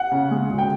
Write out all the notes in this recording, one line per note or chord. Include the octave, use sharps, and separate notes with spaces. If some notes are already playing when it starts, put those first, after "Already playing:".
Already playing: F#5
C#3
G#3
D2
G5